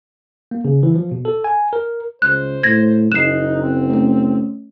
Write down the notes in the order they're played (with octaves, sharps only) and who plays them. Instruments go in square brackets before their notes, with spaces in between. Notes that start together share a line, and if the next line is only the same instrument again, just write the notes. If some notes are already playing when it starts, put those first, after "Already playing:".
[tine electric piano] A#3
C#3
E3
F3
B2
A4
G#5
A#4
[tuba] C#2 [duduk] C5 [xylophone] F#6
[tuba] A2 [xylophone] G#6 A#6
[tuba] F#1 [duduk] D#4 [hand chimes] F#6 [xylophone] C7 E7
[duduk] C4
[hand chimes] A3 C#4